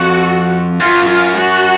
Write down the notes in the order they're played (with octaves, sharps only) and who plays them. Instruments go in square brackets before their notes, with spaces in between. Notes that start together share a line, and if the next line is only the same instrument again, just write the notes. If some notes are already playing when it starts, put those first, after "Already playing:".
Already playing: [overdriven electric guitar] F2 [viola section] F#4
[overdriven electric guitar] F#2 [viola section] F4
[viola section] F4
F#4